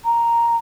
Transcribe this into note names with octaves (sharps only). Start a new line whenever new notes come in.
A#5